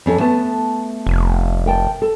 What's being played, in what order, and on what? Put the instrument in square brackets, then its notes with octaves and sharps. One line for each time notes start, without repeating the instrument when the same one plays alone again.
[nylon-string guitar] F2 C#4 A4
A3 B3 A5
[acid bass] F1
[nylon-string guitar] A#4 G5 A5
A4